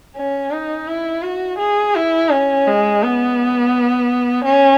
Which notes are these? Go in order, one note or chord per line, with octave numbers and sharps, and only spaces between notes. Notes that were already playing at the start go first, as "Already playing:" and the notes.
C#4
D#4
E4
F#4
G#4
E4
C#4
G#3
B3
C#4